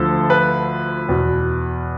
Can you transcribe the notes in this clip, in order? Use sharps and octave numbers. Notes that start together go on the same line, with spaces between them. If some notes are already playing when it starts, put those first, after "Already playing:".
Already playing: D2 D3 F3 A4
B4
E2 B2